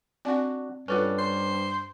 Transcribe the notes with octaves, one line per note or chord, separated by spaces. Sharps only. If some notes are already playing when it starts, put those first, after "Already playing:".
C4 D4 F#4 D5 G#5
G2 C#4 F4 A4 B4 D5 F#5
C5